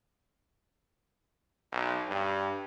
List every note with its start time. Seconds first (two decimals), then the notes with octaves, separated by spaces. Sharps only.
1.72 B1
2.09 G2